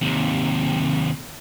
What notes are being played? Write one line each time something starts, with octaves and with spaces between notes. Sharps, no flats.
D#2 C3